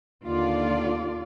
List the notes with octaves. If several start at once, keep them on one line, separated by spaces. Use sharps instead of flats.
D#2 D3 F4 D5